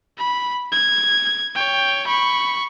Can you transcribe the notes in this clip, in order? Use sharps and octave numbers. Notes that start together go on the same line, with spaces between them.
B5
G#6
C#5 G5
B5 C#6